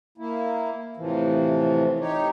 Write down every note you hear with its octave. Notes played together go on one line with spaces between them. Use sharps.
A#3 E4
A2 C3 E3 F3
D#4 G4 C#5